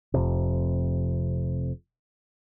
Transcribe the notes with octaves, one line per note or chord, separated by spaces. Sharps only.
F1 F2 C3